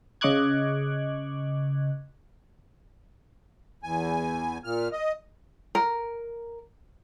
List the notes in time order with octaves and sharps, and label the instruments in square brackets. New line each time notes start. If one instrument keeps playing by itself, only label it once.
[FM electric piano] C#3 D#5 C#6 D6 F#6 G#6
[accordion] E2 G#5
A#2 F6
D#5
[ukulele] A#4